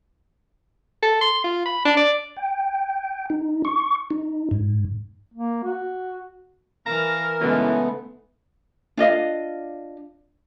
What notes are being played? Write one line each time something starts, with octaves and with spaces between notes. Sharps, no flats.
A4
C6
F4
B5
D4
D5
G5
D#4
C#6
D#4
G#2
A#3
F#4
E3 A#4 F5 A5 A#5
F#2 C#3 E3 G#3 A3 B3 D#4
D4 F4 D#5 F5